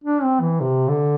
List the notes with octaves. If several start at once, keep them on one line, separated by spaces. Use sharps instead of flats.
D4
C4
E3
C3
D3